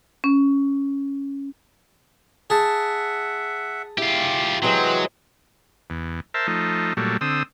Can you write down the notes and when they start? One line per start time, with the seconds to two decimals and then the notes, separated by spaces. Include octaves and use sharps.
0.24 C#4
2.50 G#4 E5 F#5 A5
3.98 E4 F4 G4
4.63 C3 E3 F#3 G#3 C5 G5
5.90 E2
6.34 A#4 C5 E5 A5
6.47 F3 A3 D#4
6.97 A#2 F#3 G3 A3
7.21 D3 C4 D#6 E6